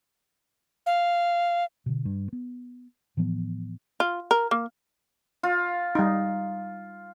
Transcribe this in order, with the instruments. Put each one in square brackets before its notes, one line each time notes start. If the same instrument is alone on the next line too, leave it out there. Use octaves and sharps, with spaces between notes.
[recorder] F5
[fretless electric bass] B2 D3
G2
B3
A2 E3 F3 B3
[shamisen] F4
A#4
A#3
[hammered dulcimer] F4
[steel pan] G3 D#4